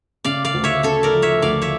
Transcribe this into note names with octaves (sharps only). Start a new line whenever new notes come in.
C#3 D5 F5
D5 F5
D2
C#5 E5
C#3 A4 C#5
A#4 D5
F3
C#5 E5
D2 D5 F5
C#5 E5